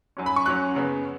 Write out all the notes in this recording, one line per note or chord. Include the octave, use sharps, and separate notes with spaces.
F#2 F#3 C#4
B5
C#6
F#2 F#3 C#4 F#6
F#2 C#3 B3